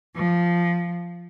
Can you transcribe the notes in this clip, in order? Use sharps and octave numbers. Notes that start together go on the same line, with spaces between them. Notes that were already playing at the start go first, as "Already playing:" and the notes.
F3